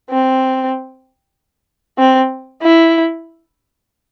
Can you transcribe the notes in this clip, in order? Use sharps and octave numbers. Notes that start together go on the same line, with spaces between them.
C4
C4
E4